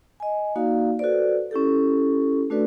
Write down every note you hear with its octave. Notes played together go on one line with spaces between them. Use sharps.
D#5 G#5
A#3 D#4 F#4 D5 F5
F#4 A4 B4 C5 D5
C#4 E4 G4 A4
A3 D4 F#4 A4 B4 D5